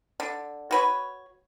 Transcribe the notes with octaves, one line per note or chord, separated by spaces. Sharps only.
D3
F#4 B4 C#5